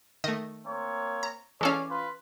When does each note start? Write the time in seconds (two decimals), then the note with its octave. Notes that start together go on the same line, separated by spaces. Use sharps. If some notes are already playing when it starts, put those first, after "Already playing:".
0.24 D#3 A3 D#5
0.66 A#3 C4 C#5
1.23 A#5
1.61 E3 G#3 C#4 A4 C#5 D5 F5
1.91 F4 B4 C6